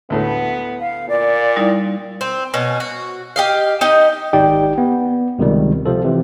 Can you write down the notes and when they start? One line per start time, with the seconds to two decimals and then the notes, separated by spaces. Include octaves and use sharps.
0.10 D2 A2 A3 B3
0.80 F5
1.09 A#2 D5
1.57 G3 D#4 E4
2.21 C4
2.54 B2 C#4
2.80 F#4
3.36 G4 D#5 F5
3.81 D#4 G4 D#5
4.33 G#1 D#4 G4 D5 G5
4.78 B3
5.39 C#2 C3 D#3 G3
5.86 C3 F3 A4
6.04 C3 E3